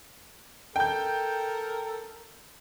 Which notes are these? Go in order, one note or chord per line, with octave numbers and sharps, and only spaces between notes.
A4 A#4 G5 G6